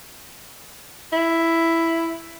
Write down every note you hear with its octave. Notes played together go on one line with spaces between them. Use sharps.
E4